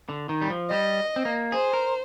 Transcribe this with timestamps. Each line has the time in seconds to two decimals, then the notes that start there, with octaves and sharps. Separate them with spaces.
0.09 D3
0.29 D#3
0.42 G3
0.50 F3
0.71 G3 D#5
1.16 C4
1.25 A#3
1.52 G#4 C5
1.73 A#4